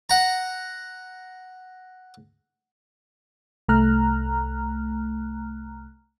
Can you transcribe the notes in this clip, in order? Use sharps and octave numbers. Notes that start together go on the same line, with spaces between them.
F#5 A#5
C2 A3 A#5 F6 F#6